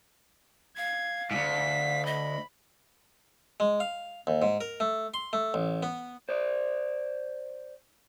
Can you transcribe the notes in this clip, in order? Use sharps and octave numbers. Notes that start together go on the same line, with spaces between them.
F5 G#6
D2 G#2 B6
D#5 B5
G#3
F5
D#2
G#2
A#4
A3
C6
A3
A1
B3
C5 D5